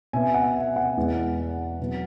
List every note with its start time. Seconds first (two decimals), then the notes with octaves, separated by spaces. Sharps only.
0.13 B2 B3 E5 G#5
0.34 F#5
0.56 E5
0.76 F#5
0.97 E2 E3 G#3 B3
1.80 B2 F#3 B3